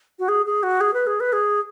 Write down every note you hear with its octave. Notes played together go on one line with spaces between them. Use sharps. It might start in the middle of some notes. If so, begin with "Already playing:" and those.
F#4
G#4
G#4
F#4
G#4
B4
G#4
B4
G#4